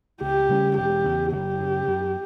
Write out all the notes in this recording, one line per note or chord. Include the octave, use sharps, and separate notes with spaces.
C#2 G4
C#3 G3 C#4
E1 G4
E2 C#3
F#1 G4
F#2 C#3
F#2